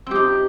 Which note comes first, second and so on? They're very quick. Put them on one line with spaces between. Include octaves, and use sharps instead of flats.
C4 G4 D#4